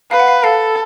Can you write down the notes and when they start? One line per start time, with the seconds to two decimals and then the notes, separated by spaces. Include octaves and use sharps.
0.11 B4 F5
0.20 F#5
0.28 F5
0.44 A4 F5